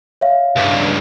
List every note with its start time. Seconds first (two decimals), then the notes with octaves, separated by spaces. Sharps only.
0.21 C#5 E5 F5
0.56 C#2 G2